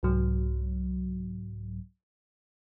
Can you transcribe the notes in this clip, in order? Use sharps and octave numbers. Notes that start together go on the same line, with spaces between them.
C2 G#2 F#3